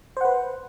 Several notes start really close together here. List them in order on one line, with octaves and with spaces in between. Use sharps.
C5 F#5 B4